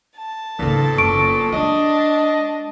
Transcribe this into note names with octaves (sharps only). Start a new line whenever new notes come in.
A5
G#1 A#2 C#3 B3 A4
F#1 C#6 D7
G#3 D4 D#5